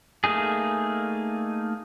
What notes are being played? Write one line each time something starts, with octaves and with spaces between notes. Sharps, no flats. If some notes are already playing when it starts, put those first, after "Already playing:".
A3 A#3 D#4 G#4